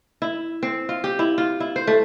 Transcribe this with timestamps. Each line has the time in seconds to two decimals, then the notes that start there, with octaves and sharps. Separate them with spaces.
0.22 E4
0.63 C4
0.89 F4
1.04 G4
1.19 E4
1.38 F4
1.60 E4
1.76 C5
1.87 A3